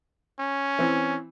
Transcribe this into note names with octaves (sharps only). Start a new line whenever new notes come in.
C#4
E3 C4